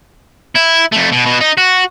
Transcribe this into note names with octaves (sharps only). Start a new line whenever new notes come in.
E4
F2 A3
B2
B2
D#4
F#4